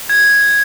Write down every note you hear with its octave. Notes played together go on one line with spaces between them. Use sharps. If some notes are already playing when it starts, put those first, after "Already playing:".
G#6